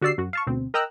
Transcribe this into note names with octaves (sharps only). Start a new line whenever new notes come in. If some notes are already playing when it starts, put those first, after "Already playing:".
D3 F#4 G4 D5 E6 C7
F#2 F#4
F5 A5 C#6
D2 B2 C4
A#4 D#5 G5 A#5 E6 F#6